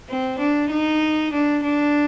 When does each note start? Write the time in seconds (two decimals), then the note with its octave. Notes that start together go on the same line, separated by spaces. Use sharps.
0.09 C4
0.40 D4
0.71 D#4
1.33 D4
1.64 D4